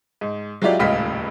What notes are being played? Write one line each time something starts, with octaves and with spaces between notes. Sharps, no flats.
G#2
F#3 G#3 E4 F4 G4 D5
D#1 C#2 A2 D#5 F5 B6